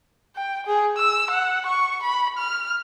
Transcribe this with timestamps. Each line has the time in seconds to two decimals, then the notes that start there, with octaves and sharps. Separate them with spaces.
0.36 G5
0.67 G#4
0.97 E6
1.30 F#5
1.67 C#6
2.03 B5
2.38 F6